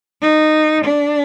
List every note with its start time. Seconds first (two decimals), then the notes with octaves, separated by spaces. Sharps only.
0.21 D#4
0.84 D4